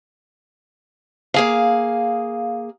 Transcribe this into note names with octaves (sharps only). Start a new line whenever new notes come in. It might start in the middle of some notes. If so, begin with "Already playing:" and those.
A#3 G#4 F5